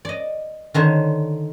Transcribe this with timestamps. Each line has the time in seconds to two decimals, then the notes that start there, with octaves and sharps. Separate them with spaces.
0.05 D5 D#5
0.74 D3 D#3 C5 C#5